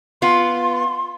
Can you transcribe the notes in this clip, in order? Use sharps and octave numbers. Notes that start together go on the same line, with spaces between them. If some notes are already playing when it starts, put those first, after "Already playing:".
B3 F4 C6